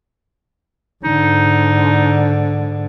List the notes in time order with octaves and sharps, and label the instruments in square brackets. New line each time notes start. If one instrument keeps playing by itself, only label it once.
[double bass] G#2 D3 [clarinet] D#4